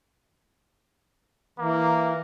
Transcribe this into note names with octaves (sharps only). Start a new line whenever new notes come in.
E3 A#3